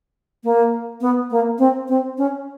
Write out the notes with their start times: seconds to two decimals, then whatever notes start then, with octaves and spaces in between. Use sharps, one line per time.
0.44 A#3
1.01 B3
1.31 A#3
1.59 C4
1.88 C4
2.18 C#4